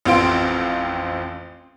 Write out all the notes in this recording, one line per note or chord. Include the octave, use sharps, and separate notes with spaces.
A1 F2 C4 F4 C6 D7